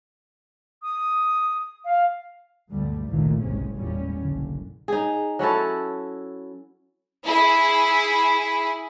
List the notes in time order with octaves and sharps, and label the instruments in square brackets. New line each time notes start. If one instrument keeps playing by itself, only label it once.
[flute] D#6
F5
[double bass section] D2 G2 B2 G3 A3
F#1 C2 A#2 D#3 E3 A3
F#1 B1 G#2 C3 G#3 C#4
A1 E2 A#2 G3 C#4
F#1 B1 D3
[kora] D#4 G#4
F#3 C#4 E4 A4
[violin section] E4 G#4